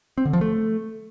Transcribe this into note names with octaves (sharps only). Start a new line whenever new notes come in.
C4
D3
F3
A3